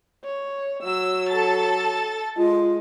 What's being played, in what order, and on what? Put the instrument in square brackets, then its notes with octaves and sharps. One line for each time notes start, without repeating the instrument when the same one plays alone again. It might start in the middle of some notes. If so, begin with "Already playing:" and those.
[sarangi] C#5
[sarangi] F#3 [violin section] E6
[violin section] A4 A6
[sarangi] G#3 [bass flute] F4